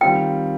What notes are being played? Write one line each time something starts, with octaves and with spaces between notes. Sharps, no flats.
D#3 G3 C4 F4 G5